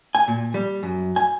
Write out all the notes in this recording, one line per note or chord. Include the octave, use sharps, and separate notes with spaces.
G#5
A#2
G3
F#2
G#5